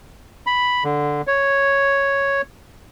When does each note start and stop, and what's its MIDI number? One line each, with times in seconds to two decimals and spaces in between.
0.47 0.84 83
0.84 1.22 50
1.27 2.42 73